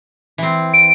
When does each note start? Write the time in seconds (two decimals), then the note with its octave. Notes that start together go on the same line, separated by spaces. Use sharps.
0.38 E3 C4
0.74 D7